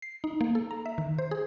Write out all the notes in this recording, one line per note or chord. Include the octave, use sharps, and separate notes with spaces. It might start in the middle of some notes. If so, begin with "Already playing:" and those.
C7
D#4
A#3
A4
A#5
E5
D#3
C5
G#4